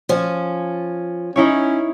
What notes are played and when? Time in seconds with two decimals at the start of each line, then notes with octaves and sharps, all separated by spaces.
0.09 F3 C#4
1.36 C#4 D#4 E4 C#5